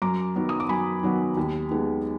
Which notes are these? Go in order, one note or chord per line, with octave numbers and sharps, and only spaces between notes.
F#2 A#5 D6
D#3 F#3 B3
D#6
D6
F#2 G#5 B5
D#3 F#3 B3
D#2
D#3 G#3 B3